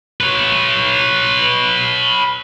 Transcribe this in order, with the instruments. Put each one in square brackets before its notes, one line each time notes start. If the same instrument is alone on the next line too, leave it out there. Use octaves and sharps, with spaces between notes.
[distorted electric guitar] B4 C#5